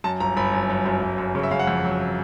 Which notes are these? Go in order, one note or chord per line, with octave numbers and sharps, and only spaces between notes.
F#2 A5
G1 A#5
G1 B5
F#2
F#2
F#2
G1
F#2
C#3
E5
C#3 F5
F#5
F2
F#3